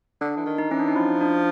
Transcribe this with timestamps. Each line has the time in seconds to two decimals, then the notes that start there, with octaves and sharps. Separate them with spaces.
0.21 D3 D4
0.37 E3
0.46 D#3
0.58 D#4
0.71 E3 C#4
0.79 D4
0.88 D#4
0.95 F3 E4
1.21 D4